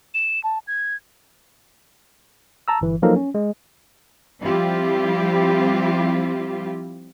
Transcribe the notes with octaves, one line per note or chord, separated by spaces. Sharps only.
E7
A5
G#6
A5 A#5 E6
G1 E3
F3 F#3 A#3 D#4 A4 A#4
C#4
G#3
F3 G3 C4 E4 F4 G4